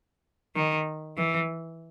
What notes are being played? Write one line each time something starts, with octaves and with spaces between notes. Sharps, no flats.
D#3
E3